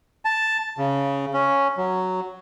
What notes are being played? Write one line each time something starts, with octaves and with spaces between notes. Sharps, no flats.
A5
C#3
C#4
F#3